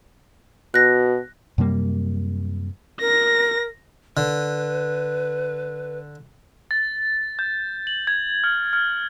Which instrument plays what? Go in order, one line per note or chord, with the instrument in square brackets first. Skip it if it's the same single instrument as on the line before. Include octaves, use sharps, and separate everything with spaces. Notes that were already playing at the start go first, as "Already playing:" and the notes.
[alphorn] B2 [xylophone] F#6 A#6
[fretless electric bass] F#2 C3 G3 A#3
[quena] A#4 [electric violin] A#6
[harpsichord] D3 [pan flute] B4
[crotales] A6
G6
F#7
G#6
F6
F6